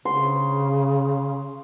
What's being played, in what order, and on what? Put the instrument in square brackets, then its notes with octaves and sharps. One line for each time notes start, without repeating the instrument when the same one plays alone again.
[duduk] C#3 [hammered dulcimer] C6